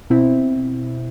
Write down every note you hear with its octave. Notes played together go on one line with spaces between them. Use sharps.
B2 C4 E4